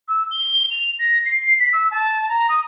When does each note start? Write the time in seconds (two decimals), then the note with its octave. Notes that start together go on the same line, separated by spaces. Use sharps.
0.08 E6
0.31 G7
0.71 F7
0.99 A#6
1.26 C7
1.60 B6
1.73 E6
1.91 A5
2.29 A#5
2.49 D#6